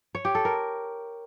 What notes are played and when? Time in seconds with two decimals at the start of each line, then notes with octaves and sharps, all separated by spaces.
0.15 C#5
0.25 G4
0.35 A4
0.45 A#4